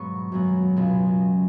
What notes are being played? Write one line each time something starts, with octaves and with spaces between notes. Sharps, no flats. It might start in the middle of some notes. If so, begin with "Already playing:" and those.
Already playing: G#2 B2 F#3 B3 B5 C#6
F#2 F#3 B3
C#2 B2 B3